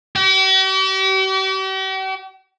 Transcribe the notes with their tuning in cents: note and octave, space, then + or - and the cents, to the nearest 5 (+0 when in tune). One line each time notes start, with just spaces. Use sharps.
G4 -45